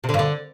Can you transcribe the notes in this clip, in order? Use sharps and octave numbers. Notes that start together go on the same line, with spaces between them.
C3
D3
G2
D3